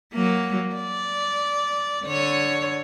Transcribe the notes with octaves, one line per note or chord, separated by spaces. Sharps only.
F#3 A#3
D5
D3 C#5